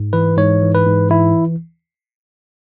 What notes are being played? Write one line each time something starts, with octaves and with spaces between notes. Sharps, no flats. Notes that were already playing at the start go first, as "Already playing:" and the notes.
Already playing: G#2
E3 B4
G#2 C#5
E3
B4
G#2
E3 E4